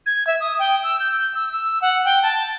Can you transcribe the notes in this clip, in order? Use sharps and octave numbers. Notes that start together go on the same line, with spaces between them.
G#6
E5
D#6
G5
E6
G6
E6
E6
F#5
G5
A5